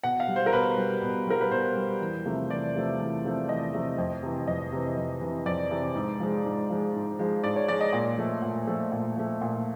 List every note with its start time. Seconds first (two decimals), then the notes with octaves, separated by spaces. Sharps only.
0.03 B2 F#5
0.20 F5
0.28 G3
0.36 C5
0.46 A#4
0.53 B2 B4
0.78 G3
1.02 B2
1.27 G3 A#4
1.41 B4
1.51 B2 C5
1.76 G3
2.01 E2
2.26 C3 F3 A3
2.50 E2 D5
2.75 C3 F3 A3
2.99 E2
3.24 C3 F3 A3
3.49 E2 D#5
3.74 C3 F3 A3
3.98 F2
4.23 C3 E3
4.47 F2 D#5
4.72 C3 E3
4.97 F2
5.21 C3 E3
5.46 F2 D5
5.71 C3 E3
5.95 G#2
6.20 F3 G#3
6.45 G#2
6.70 F3 G#3
6.94 G#2
7.19 F3 G#3
7.44 G#2 D5
7.56 C#5
7.68 F3 G#3 D5
7.81 D#5
7.93 A#2
8.17 F3 A3
8.42 A#2
8.67 F3 A3
8.92 A#2
9.16 F3 A3
9.41 A#2